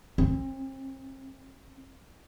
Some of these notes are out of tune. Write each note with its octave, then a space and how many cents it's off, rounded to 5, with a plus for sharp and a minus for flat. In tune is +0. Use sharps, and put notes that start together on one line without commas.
C4 +35